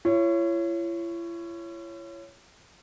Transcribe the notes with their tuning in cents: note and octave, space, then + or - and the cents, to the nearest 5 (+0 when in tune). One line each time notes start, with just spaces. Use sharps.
E4 +45 C#5 +0